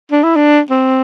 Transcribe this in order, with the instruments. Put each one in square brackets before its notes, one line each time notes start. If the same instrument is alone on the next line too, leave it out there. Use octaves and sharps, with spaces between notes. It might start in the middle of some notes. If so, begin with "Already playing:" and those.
[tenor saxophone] D4
E4
D4
C4